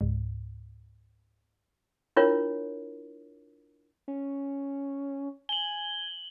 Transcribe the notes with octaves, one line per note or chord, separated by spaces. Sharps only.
C#2 G#2
D4 E4 F4 A#4 C#5
C#4
G#5 F#7 G7